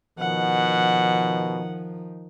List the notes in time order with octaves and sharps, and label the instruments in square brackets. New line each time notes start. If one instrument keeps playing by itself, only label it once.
[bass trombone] B2 [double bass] D#3 F3 [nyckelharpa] F#5